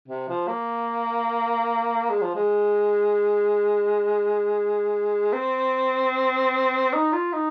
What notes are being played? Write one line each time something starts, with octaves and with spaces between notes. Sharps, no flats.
C3
F3
A#3
G#3
F3
G#3
C4
D#4
F4
D#4